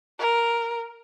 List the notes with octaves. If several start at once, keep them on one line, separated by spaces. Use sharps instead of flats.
A#4